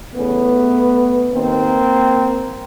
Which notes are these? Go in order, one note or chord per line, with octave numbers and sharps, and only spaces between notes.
E2 C#3 E3 A3 B3
D#2 D#3 A#3 C4